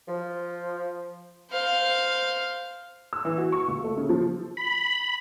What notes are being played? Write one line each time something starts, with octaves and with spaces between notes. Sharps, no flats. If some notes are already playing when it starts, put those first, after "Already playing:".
F3
C5 F5
E6
E3
F#4
C#6
C#2
A3
C#3
F3
B5